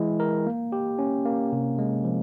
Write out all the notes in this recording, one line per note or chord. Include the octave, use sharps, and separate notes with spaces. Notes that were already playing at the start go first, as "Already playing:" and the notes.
Already playing: E3 G#3 E4
A#4
A#3
G4
C#4
A#3
C3
G#3
F3